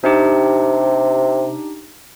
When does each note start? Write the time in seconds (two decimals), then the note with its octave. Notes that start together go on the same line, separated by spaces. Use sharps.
0.04 C3 D4 D#4 G4